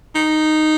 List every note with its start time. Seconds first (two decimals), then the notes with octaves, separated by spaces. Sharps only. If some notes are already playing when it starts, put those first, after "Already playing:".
0.15 D#4